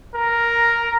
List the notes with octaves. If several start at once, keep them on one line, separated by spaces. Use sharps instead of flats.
A#4